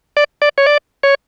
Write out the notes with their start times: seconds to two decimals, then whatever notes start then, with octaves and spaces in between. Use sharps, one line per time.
0.17 D5
0.42 D5
0.58 C#5
0.66 D5
1.03 C#5